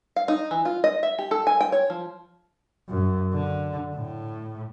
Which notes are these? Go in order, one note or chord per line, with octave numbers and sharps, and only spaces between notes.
F5
D#4
E3
F4
D#5
E5
G4
A4
G#5
G5
C#5
F3
F#2
D3
A2